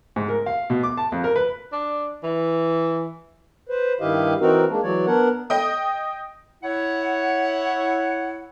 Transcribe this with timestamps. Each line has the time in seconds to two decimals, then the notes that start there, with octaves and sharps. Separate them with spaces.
0.16 G#2
0.28 A#4
0.46 F5
0.70 B2
0.83 D6
0.97 A5
1.12 F2
1.24 A#4
1.36 B4
1.72 D4
2.23 E3
3.69 B4 C5
4.00 G2 D#3 E4 G4 D#5 F5
4.41 E3 C4 D#4 F#4 A#4
4.70 G#3 A#3 D4
4.83 E3 F#3 C#5 D5
5.06 B3 D4 A#4 F#5
5.50 D#5 G5 D#6
6.64 E4 C#5 F#5